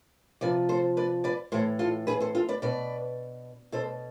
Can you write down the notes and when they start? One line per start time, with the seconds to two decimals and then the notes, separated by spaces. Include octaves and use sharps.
0.41 C3 F3 B4 D5
0.69 A4 C5
0.97 B4 D5
1.24 B4 D5
1.52 A2 E3 A4 C5
1.79 F4 A4
2.07 G#4 B4
2.20 A4 C5
2.35 F4 A4
2.49 B4 D5
2.62 B2 B4 D5
3.72 B2 A4 C5